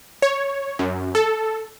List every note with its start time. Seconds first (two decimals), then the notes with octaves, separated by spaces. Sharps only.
0.22 C#5
0.79 F#2
1.15 A4